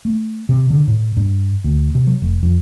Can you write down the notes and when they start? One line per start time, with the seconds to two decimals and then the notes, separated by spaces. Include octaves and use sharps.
0.05 A3
0.49 C3
0.70 D3
0.88 A2
1.17 G2
1.64 D2
1.95 C3
2.07 F#3
2.22 F1
2.43 F2